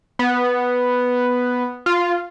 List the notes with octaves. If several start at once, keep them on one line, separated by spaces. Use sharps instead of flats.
B3
F4